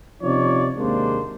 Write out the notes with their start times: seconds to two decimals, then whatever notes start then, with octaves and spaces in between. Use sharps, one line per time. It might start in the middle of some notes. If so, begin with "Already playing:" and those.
0.22 C3 F3 C#4 D#4 C#5 D5
0.77 D#2 C3 G#3 A#3 D4 C5